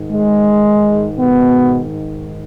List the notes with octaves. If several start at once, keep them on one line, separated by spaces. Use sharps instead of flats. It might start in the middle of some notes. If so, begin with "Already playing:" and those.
Already playing: G#2 D#3
G#3
B2 B3